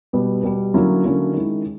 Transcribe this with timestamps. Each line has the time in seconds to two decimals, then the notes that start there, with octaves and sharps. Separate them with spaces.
0.13 B2 G3 B3
0.43 B2 G3 B3
0.74 D3 F#3 A#3 C#4 E4
1.04 D3 F#3 A#3 C#4 E4
1.33 D#3 G#3 C#4 E4